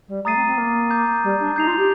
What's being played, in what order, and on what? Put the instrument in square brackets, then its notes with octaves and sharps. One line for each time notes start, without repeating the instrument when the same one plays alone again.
[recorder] G3
[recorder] A3 [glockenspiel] A#5 D#6 A6 C7 D#7
[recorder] C4
C4
A#3
[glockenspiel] A#5 D6 G6
[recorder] G3
D4
[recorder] D#4 [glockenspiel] G6 C7 F7
[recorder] F4
G4